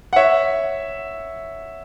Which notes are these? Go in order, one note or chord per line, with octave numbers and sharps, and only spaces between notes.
F#5
C#5 E5